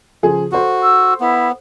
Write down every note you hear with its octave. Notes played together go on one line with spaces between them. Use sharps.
C#3 F3 G#4
F#4 A4 C5
E6
B3 E4